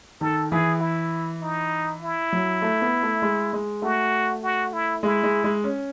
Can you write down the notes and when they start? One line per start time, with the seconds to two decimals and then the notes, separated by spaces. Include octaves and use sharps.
0.21 D#3 A4
0.51 E3 G#4
0.81 E4
1.41 D#4
2.02 E4
2.32 F#3
2.62 A3
2.82 B3
3.03 A3
3.22 G#3
3.53 G#3
3.82 A3 F#4
4.43 F#4
4.73 E4
5.03 G#3 E4
5.23 G#3
5.44 G#3
5.64 C#4